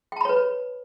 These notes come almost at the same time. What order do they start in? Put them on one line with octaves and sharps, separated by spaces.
G5 A5 B5 C#5 B4